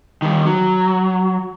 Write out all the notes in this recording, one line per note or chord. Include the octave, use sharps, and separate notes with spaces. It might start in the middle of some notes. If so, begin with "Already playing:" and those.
D#3 G3
F#3